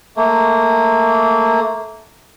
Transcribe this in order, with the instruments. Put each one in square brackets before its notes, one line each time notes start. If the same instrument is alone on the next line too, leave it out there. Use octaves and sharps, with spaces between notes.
[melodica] A3 A#3